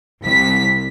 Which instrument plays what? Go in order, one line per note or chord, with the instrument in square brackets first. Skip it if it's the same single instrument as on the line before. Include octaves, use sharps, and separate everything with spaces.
[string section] C2 B6